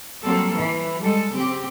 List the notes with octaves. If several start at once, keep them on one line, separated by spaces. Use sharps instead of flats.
F#3 G3 A#3 C4 A4
E3
G3 G#3 A4
C#3 C4 G4